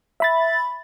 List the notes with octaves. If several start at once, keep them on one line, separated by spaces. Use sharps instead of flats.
E5 B5 A6